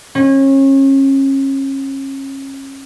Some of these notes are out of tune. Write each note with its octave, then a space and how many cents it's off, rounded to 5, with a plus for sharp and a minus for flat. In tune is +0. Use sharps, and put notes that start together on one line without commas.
C#4 -30